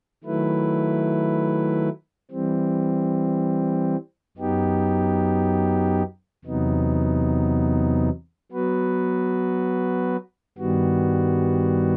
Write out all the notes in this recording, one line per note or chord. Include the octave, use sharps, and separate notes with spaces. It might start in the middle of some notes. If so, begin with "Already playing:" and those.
D#3 F#3 A3 E4 B4
E3 G3 C4
F#2 F#3 B3 D#4 G4
E2 C3 F#3 B3 D#4
F#3 B3 F#4 B4
G2 D#3 G3 B3 F#4